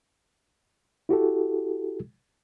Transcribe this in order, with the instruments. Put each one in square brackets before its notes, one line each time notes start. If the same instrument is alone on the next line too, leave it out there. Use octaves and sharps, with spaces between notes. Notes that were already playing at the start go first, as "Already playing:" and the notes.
[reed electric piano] E4 F#4 G4 A4